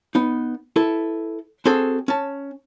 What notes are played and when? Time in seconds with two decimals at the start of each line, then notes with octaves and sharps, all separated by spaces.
0.15 B3 D#4
0.76 E4 A4 B4
1.66 C4 F#4 G#4 A4
2.08 C#4 A5